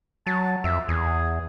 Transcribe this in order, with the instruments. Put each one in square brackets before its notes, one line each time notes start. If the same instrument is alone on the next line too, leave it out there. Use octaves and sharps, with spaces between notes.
[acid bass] F#3 [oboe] A5
[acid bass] F2 [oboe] E5
[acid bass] E2 [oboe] G#4